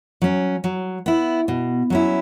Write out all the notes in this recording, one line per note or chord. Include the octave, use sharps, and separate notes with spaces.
F#3 C#4
F#3
B3 E4
B2
F#3 C#4 E4